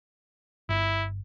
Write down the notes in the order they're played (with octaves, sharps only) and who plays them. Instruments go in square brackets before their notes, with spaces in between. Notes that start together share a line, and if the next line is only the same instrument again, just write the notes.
[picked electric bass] G1 [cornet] E4